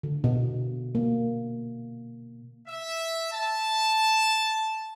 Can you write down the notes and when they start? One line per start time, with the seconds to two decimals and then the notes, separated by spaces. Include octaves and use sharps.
0.03 D3
0.24 B2
0.95 A#3
2.67 E5
3.32 A5